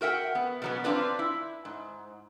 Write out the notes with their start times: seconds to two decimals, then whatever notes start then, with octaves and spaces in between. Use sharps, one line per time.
0.01 F#4 A#4 E5 F#5 G5
0.35 B3
0.62 B2 F#3 B3
0.84 C4 D4 F4 B4 D5
1.19 E4
1.65 G#2